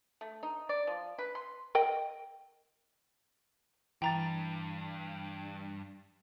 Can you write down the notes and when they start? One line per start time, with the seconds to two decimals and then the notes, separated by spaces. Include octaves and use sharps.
0.21 A3
0.43 D#4
0.69 D5
0.87 F3
1.18 B4
1.35 C6
1.75 A#4 D#5 G5
4.02 G2 E3 G5 A#5 A6